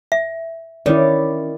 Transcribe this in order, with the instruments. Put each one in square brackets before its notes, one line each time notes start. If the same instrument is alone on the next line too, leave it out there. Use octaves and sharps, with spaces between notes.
[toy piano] E5
[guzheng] D#3 [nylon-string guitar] C#4 C#5 [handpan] E4 D5